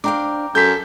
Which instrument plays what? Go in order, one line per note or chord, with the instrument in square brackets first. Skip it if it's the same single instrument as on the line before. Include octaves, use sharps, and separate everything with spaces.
[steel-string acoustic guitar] D4 C5 F5 [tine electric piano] G5 A#5 D6
[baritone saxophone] F#2 [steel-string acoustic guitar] A4 [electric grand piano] G6 B6